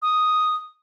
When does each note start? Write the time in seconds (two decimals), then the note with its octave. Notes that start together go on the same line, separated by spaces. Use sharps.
0.02 D#6